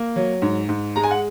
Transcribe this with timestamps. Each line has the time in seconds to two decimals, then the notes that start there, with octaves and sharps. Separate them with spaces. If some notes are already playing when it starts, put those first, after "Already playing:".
Already playing: A#3
0.16 F#3
0.42 G#2
0.69 G#2
0.96 G#3 A#5
1.04 G#5
1.11 F#5